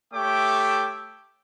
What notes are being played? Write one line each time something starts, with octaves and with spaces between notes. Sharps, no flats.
A3 G4 C#5 E5 G5 D6